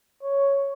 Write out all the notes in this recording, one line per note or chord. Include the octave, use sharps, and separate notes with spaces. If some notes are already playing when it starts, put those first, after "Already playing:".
C#5